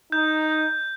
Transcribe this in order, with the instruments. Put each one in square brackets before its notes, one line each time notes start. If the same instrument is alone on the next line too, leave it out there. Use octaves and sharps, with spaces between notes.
[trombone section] D#4 [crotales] G6